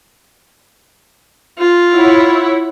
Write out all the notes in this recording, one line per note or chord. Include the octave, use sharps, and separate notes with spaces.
F4
E4 C#5 F#5